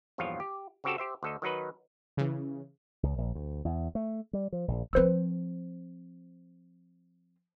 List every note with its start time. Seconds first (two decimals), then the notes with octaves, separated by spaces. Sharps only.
0.18 A#1 E2 G2 F3 F4 C#5
0.40 G4
0.84 C#3 C4 F#4 G4 A4
0.98 G4 C5 E5
1.23 D2 A4 D#5
1.42 D#3 F#3 D#4 B4
2.17 C#3 E3
3.03 C#2
3.18 A#1
3.35 D2
3.65 E2
3.95 A3
4.33 G3
4.52 F3
4.68 A#1
4.93 F3 C4 B4 C5 E6